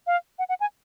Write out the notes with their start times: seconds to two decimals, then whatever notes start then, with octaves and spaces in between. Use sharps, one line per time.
0.07 F5
0.39 F#5
0.49 F#5
0.60 G#5